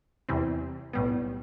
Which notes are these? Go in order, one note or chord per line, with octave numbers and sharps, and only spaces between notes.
E2 C3 E3 G3 C4
B1 A2 G3 B3